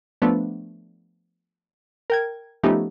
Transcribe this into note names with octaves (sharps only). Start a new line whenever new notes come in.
F3 A3 B3 D4
A#4 G5 G#6
F3 A3 B3 C#4 D#4 G4